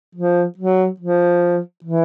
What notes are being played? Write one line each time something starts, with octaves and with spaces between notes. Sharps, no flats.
F3
F#3
F3
E3